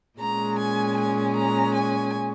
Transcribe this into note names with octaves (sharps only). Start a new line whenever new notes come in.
A#2 G#3 C#4 A#5
G#5
G#5
A#5
G#5